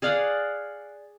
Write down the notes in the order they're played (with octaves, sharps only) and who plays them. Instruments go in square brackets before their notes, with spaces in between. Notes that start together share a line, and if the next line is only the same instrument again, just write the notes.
[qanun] G#4 D5 F5 F#5